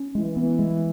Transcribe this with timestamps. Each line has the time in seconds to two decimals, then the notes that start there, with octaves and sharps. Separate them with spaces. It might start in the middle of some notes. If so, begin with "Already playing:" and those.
Already playing: C#4
0.15 E3 G#3
0.37 B3
0.59 G#3